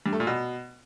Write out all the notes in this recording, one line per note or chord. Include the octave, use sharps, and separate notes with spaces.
G2
A3
A#2
B2